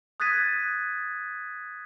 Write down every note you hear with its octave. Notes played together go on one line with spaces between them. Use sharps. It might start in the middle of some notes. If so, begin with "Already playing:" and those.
D#6 F#6 G#6 A6 B6 D#7